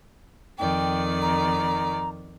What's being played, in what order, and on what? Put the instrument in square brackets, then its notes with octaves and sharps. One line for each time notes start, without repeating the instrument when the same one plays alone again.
[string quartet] F2 D#3 D5 [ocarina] G5
[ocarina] A#5